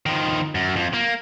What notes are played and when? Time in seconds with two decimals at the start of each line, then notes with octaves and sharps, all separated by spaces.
0.06 D#3 F3
0.55 F#2
0.76 F2
0.94 A#3